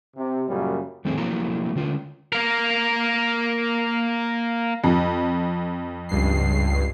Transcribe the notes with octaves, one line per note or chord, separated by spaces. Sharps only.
C3
F#2 A#2 C#3 F#3 G3
F2 D#3 A3 C4 D#4 G#4
F3 F#3 A3 A#3 E4 A#5
D3 C#4 F4
A#3 A#4
F2
C#2 G2 C7